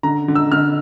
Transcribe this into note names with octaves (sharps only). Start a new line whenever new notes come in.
D3 A#5
D3
E6
D3 F6